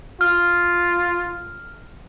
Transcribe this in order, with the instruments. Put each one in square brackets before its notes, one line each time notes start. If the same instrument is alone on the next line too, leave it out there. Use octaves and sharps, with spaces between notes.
[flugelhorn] F4 [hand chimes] F6